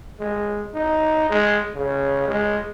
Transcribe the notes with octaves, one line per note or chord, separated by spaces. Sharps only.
G#3
D#4
G#3
C#3
G#3